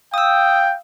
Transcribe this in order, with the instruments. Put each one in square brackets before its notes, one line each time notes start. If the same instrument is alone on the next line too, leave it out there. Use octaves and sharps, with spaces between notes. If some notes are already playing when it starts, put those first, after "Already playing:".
[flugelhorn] F5 [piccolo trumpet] G5 [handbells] D#6 E6